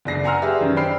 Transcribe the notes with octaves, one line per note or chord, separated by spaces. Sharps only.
F#1 D4 A#6 C7
F#5 G#5 A#5 C6 E6 F6
G4 G#4 B4 D5 E5
F#2 D#3
D4 C5 G5 B5 F6 C7